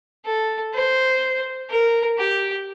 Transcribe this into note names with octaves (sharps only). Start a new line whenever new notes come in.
A4
C5
A#4
G4